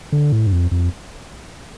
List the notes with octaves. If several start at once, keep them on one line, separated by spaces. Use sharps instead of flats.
D3
A2
G2
F2
F2